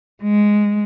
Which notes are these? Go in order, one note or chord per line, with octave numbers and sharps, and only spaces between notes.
G#3